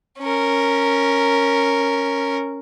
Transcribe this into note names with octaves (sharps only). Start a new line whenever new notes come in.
C#4 A#4